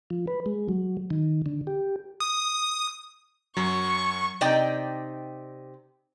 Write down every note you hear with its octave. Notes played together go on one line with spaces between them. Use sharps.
F3
B4
G#3
F#3
D#3
D3
G4
D#6
F#2 F#3 C#6
C3 D#4 D5 D#5 G5